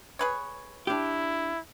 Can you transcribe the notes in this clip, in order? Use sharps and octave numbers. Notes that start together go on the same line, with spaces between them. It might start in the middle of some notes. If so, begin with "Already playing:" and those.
G#4 B4 C#5
D4 E4 G4